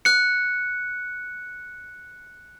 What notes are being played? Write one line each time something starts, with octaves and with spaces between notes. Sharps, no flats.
F#6 C#7